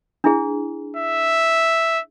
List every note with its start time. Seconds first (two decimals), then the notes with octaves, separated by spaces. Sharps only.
0.24 D4 E4 G#4
0.97 E5